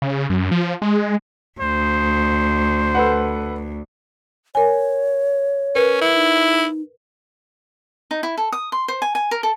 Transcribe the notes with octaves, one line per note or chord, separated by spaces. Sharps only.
C#3
F#2
F3
G#3
D2 C5
A4 B4 F#5
A#4 C#5 G#5
C#4 A#4 B4
E4
D#4
D#4
E4
A4
D#6
C6
C5
G#5
G#5
A#4
A4